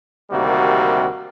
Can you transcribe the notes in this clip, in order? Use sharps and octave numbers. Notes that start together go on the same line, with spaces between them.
D2 C3 D#3 G3 A#3 F#4